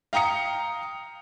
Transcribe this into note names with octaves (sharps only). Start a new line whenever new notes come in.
F5 G5 A#5 D#6 C#7